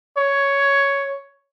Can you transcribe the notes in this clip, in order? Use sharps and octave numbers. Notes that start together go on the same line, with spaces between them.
C#5